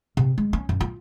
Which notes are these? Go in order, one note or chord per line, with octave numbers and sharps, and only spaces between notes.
C3
G#3
C#4
F#2
F4